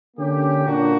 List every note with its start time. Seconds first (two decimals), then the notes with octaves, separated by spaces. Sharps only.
0.16 D3 A#3 C#4 G4
0.65 A#2 A#3 D4 F#4